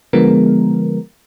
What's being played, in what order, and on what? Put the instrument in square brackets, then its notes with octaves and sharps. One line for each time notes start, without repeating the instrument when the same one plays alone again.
[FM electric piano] D3 F3 G#3 B3 A#4